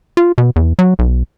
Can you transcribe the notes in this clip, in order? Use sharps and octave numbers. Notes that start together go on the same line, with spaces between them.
F4
B2
E2
F#3
B1